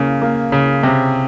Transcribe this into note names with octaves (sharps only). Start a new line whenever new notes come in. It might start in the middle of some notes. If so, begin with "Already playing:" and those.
Already playing: C#3 A#3
A#3
C#3
C3